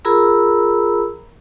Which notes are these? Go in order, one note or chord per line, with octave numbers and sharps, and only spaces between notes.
F4 G#4 A#4 A#5 B5 E6